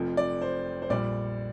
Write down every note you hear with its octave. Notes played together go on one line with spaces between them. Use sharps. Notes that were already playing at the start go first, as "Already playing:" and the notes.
Already playing: F1 F2 F3
D5
C5
C5
A#1 A#2 G3 D5